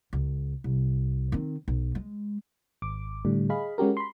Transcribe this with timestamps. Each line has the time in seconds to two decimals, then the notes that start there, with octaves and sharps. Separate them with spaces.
0.13 C#2
0.64 C2
1.32 D#3 C4
1.68 B1
1.95 G#3
2.82 G#1 D6
3.25 A2 D3 G3
3.50 G#4 D#5 F5 B5
3.78 G#3 C#4 F#4 G4 A#4
3.97 B5 C6